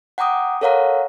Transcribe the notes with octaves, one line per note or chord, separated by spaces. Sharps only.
F#5 G5 A#5 D6 D#6
A4 A#4 C#5 F5 F#5 A#5